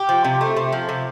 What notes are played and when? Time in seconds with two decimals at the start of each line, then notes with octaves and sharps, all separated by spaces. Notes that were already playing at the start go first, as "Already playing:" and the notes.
Already playing: G4
0.09 F3
0.24 C3
0.41 A3
0.56 C3
0.72 F3
0.89 C3